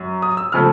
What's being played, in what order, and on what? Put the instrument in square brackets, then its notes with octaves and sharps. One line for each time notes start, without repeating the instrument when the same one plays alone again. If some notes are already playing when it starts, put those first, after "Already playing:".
Already playing: [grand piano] F#2
D#6
E6
C#3 F3 A3 F6